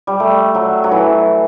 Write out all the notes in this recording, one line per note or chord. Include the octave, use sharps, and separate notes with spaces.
G3
A3
F#3
F#3
E3